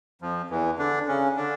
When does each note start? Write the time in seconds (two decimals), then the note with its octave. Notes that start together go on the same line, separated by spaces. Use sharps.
0.22 F2 F3
0.50 E2 E3
0.79 D3 D4
1.08 C#3 C#4
1.37 D3 D4